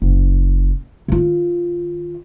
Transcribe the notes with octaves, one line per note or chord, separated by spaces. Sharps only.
F#1
D#3 F4